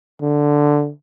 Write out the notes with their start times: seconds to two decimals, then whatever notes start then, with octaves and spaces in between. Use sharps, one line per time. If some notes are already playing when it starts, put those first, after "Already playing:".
0.21 D3